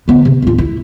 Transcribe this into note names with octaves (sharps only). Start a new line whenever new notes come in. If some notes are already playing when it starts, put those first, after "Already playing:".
D3 B3
C3
D1 F4
E4